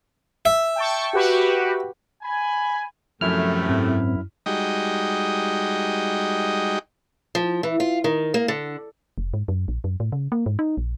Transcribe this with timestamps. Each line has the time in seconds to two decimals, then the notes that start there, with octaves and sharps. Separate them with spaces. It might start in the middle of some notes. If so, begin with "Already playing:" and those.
0.45 E5
0.76 G5 A5 C#6
1.13 F#4 G4 B4
2.22 G#5 B5
3.21 F#2 A2 C3 F3 A3 E4 F6
3.69 G#2 C4
4.46 G3 G#3 D#4 F#4 D#5 G5
7.35 F3
7.63 E3
7.80 F4
8.04 D#3
8.34 A#3
8.48 D3
9.18 F1
9.34 G#2
9.48 F#2
9.68 A#1
9.84 F#2
10.00 A2
10.12 C#3
10.32 A#3
10.46 G#2
10.59 D#4
10.77 A#1